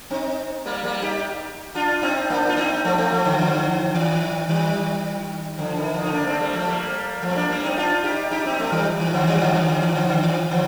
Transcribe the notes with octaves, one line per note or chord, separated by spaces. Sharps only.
C4 D#4
G3 A#3
G3 A#3
D#4 G4
D4 F4
C4 D#4
A#3 D4
F4
C4 D#4
F3 A3
A3 C4
F3 A3
D3 F3
D3 F3
D#3
D#3 G3
D3 F3
D#3
D3 F3
D#4
A#3 D4
A3 C4
G3 A#3
F3 A3
G3 A#3
F3 A3
C4
A#3 D4
G3 A#3
C4 D#4
D4 F4
D#4 G4
D#4 G4
C4 D#4
A3 C4
D#3 G3
D#3
D3 F3
D#3 G3
D3 F3
D#3
D3
D#3
D3 F3
D3
D#3
D3 F3